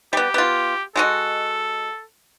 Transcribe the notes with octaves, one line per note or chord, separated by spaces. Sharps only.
G3 B3 G4
B3 F4
G#3 F#4 A4 D#5